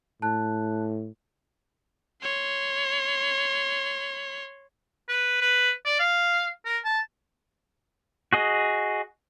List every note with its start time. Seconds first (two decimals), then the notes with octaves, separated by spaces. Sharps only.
0.22 A2 A5 F#6
2.22 C#5 C6
5.09 B4
5.41 B4
5.85 D5
6.00 F5
6.65 A#4
6.85 A5
8.33 F#4 G#4 D#5